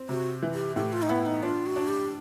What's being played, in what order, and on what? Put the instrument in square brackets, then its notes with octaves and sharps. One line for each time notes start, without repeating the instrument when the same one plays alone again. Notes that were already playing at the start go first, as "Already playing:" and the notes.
Already playing: [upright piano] C4
[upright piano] C3 [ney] F#4
[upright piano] E3
[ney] G4
[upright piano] A2 [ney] G4
[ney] F4
D#4
[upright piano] B3 [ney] E4
[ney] D#4
[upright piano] D4 [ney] F4
[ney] F#4
[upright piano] D4
[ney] G4